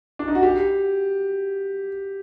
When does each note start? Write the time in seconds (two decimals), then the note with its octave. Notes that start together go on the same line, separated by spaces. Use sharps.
0.19 D4
0.28 D#4
0.35 F#4
0.43 G4